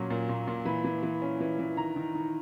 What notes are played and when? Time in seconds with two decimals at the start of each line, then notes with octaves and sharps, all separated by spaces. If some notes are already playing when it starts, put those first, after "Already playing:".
Already playing: A#2 F#3 C#4
0.10 A#2
0.29 A#2
0.47 A#2
0.65 E3 B5
0.85 E3
1.03 E3
1.22 C#4
1.41 E3
1.59 E3
1.77 D#3 A#5
1.96 D#3
2.15 D#3